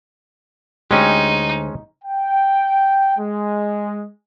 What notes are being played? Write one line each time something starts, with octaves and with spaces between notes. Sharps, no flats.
D2 G#3 C#4 D#4 G4
G5
G#3